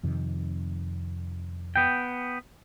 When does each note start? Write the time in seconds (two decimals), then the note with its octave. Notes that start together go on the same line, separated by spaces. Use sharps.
0.03 F2 C3 D#3
1.76 B3 G5